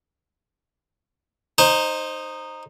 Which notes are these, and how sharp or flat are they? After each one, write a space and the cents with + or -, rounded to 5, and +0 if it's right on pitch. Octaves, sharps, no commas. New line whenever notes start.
D#4 -10 C5 +10